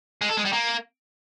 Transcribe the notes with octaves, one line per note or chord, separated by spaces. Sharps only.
G#3
A4
G#3
G3
A#3